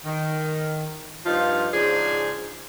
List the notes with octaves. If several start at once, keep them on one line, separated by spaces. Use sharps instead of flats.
D#3
G2 F3 D#4 F4
G#2 C#3 F3 D4 D#4 G#4